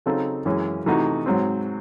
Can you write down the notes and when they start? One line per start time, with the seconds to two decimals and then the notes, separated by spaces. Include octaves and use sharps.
0.06 C#3 F#3 C4 D#4 A4
0.46 F#2 E3 G#3 C#4
0.86 C3 E3 A3 D#4 F#4
1.26 G#2 F#3 C4